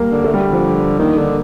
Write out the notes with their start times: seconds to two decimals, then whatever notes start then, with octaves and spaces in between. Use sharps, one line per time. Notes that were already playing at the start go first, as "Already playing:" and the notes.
Already playing: G3 A#3
0.12 D3
0.24 A3
0.34 G3
0.53 F3
0.99 D#3 A#3
1.18 D3